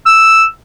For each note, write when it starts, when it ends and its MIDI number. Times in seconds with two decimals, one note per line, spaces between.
0.06 0.45 88